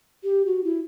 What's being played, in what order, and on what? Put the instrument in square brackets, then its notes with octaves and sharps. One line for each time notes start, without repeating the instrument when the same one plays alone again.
[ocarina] G4
F#4
E4